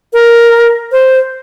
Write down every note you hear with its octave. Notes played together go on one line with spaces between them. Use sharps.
A#4
C5